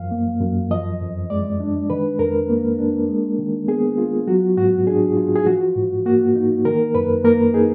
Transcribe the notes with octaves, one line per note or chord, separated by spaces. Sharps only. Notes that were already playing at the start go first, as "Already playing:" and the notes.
Already playing: F#2 F3 F5
A#3
F#2
F3 D#5
F2
G#3 D5
D4
D#3 B4
F2 A#4
A#3
D4
G#3
D#3
B3 G#4
F4
F#3 F#4
G#2 F#4
D4 G#4
F4
G#4
F3 F#4
G#2
A#3 F#4
D#4
D#3 A#4
F#2 B4
A#3 A#4
D#4 G#4